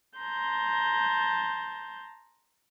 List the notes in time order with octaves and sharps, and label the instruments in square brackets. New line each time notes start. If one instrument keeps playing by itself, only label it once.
[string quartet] A5 A#5 C6 G6